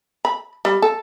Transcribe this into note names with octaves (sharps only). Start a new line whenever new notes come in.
B5
G3
A4